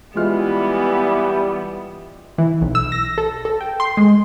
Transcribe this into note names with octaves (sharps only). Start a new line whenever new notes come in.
E3 G3 G#3 B3 F4 F6
E3
B1
E6
A#6
A4
A4
G5
C6
G#3